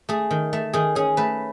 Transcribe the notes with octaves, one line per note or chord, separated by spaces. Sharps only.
A3 G#4
D#3
A3
D#3 G#4
C#4 G#4
A3 B4